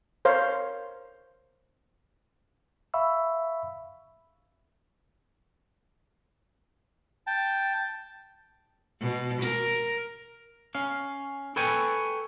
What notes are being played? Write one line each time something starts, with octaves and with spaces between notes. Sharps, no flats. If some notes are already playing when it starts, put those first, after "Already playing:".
A#4 C5 C#5 F5
E5 F5 B5 C#6 E6
G5 A5
B2
A#4
C#4 F5
A4 B4 C#5 G5 G#5